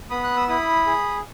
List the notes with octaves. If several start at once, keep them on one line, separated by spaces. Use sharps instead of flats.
B3 B5 D#6
F#6
E6
E4 B5 D#6
G#4